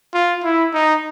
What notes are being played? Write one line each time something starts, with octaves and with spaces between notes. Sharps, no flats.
F4
E4
D#4